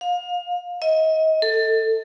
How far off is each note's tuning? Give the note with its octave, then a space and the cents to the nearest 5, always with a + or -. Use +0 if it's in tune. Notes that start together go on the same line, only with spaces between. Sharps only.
F5 +30
D#5 +30
A4 +20